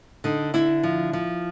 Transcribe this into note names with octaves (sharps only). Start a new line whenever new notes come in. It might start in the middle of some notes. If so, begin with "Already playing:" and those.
D3 D#4
D3 E4
F3
F3